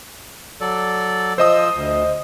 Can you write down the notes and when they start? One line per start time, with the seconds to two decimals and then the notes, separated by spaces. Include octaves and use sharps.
0.61 F#3 A4 D5
1.38 F3 C5 D#5 D#6 E6
1.75 D2